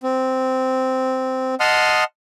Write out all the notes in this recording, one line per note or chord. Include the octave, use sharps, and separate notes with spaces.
C4
D#5 F#5 A5 C6 D#6 F6